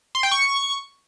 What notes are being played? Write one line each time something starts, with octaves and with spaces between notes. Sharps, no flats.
C6
G5
C#6